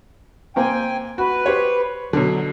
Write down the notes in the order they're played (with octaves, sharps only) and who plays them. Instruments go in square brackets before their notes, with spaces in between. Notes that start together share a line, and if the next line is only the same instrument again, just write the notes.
[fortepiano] C3 A#3 C4 [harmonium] G5 G#5
[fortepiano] F#4 [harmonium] B4
[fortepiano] G4 C5 C#5
[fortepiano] B2 D3 [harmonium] F#3